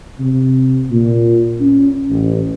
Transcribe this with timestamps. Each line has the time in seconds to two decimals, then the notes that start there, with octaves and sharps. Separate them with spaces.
0.19 C3
0.90 A#2
1.61 C#4
2.10 A1